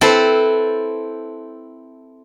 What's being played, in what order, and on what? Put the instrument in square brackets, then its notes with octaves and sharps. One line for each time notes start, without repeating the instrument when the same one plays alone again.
[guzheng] C4 E4 A4 B4 C5